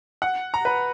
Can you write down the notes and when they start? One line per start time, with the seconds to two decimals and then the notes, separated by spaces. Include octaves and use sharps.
0.22 F#5
0.54 A#5
0.65 B4